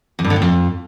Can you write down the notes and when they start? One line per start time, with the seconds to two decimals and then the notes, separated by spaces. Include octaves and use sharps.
0.19 E2
0.24 G2
0.30 D3
0.36 A2
0.42 F2